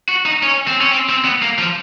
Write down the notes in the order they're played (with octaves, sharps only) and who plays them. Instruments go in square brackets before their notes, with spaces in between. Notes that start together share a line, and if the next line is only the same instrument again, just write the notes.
[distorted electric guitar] F#4
D#4
C#4
C4
C#4
C4
C4
B3
A#3
F3